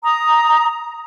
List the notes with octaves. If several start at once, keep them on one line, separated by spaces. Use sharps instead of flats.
A#5 D#6